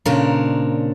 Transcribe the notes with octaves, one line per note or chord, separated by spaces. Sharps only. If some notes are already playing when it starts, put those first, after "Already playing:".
A#2 C#3 C4 D4 A#4 C#5